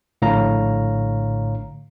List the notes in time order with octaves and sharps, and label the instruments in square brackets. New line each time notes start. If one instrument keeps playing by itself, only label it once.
[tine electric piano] A#1 A2 D3 C#5 F5 A#5